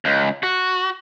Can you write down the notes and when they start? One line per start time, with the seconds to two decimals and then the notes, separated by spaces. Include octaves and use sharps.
0.05 C#2
0.43 F#4